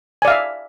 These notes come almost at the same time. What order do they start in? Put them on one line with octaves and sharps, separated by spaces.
G#5 D5 F5 E5